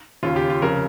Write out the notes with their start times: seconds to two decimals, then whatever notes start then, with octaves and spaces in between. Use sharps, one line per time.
0.23 D#2 C#3 F4
0.36 G4
0.49 F4
0.62 F1 F2 C#3 A#4